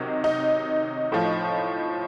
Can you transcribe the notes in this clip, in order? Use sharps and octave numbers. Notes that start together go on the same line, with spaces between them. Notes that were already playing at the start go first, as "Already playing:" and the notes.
Already playing: C3 D#3 F#3 D#4
D#4
A2 F3